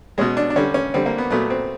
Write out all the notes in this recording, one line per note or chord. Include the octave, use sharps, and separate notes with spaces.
B2 G#3 C#4
D4
D4
D3 G3 C#4
C#4
D3 G3 C4
A#3
B3
A#2 F#3 A3 B3
C4